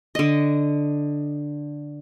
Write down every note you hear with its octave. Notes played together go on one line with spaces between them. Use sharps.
D3 D#5